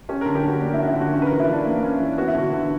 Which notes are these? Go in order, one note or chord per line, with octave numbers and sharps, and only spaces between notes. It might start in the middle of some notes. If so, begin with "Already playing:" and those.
C#4 G4
A#4
D3
G4
D3 F#4
A#3 D4
E4
C#4 F#4
E4
D3 F#4
C#4 F#4
B4
E3 A#4
E4
E3 D4
A#3
C#4
E3
B3 F#4
E4
D3 F#4
D3